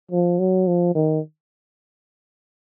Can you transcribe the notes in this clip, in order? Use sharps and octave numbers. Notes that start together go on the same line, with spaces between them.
F3
F#3
F3
D#3